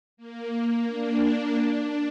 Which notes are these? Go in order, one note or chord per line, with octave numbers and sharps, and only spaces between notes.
A#3
D4
D4